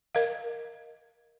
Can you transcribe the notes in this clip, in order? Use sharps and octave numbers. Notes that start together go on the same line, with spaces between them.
A#4 D#5 F5